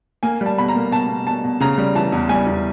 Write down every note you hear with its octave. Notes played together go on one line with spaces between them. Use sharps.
A#3 G#5
G3
A5
B2 B5
A#5
A#3
B2 A5
B2
B2 A5
B2
C#3 A#5
G3
E3 A5
E2
G3 G#5
E2